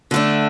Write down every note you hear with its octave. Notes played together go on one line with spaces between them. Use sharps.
D3 A3 D4